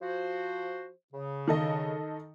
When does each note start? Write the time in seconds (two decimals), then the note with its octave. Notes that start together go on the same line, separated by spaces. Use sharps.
0.01 F3 F#4 C5
1.13 C#3
1.48 D#3 A4 D#5